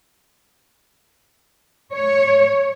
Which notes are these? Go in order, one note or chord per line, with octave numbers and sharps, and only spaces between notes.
C#5